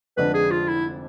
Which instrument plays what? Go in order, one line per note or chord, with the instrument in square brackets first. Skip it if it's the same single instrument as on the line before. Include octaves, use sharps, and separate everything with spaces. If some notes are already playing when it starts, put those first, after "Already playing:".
[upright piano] F1 F2 D3 G#3 D4 [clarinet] B4
[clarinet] G#4
F4
E4